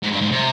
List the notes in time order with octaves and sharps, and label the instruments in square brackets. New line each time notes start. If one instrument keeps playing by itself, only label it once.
[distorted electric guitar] G#2
G2
G#2
C3